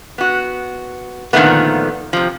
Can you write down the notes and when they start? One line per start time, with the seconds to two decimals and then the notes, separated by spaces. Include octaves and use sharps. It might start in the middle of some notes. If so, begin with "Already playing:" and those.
0.18 B3 F#4
1.33 A#2 D3 D#3 F3 A3 B3
2.13 C3 F3